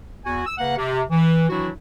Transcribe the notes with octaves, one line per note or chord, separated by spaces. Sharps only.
E2 F#4 G#5
E6
C#3 A#3 B4 F#5
C3
E3
D#3 E3 F#3 D4 E4 F#4